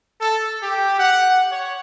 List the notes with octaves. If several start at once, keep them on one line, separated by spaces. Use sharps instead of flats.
A4
G4
F#5
C#5